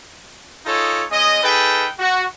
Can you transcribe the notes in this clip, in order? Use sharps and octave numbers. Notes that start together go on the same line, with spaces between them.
D#4 F4 G#4 A4 C#5
G#3 C#4 D#5
D#4 G#4 A4 B4 G5
F#4